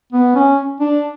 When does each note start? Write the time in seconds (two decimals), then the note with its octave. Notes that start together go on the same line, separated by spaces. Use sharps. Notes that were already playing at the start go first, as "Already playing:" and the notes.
0.13 B3
0.36 C#4
0.80 D4